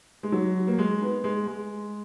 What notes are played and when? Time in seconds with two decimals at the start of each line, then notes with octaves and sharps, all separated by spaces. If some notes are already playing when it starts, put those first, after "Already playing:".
0.23 G#3
0.32 F#3
0.67 A#3
0.78 G#3
1.02 B3
1.24 G#3
1.47 G#3